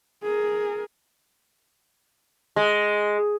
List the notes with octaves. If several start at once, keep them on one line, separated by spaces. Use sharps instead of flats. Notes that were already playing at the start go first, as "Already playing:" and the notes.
G#4 A#4
G#3